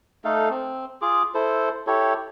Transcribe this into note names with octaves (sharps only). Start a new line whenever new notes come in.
A3 D#4 A4 F5
C4
F4 G#4 D6
E4 A4 C5
E4 G4 A4 C#5